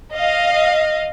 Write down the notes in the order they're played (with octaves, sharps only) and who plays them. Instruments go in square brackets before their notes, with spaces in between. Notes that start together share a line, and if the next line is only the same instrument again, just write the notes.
[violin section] D#5 F5